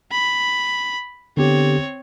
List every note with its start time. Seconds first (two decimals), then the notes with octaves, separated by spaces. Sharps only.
0.11 B5
1.37 D3 B3 C4 G4 C#5